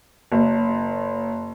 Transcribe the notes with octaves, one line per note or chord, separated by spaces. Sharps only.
F#1